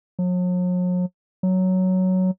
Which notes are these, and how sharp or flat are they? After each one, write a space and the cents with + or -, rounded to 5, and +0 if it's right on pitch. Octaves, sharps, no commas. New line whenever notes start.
F#3 -45
F#3 +5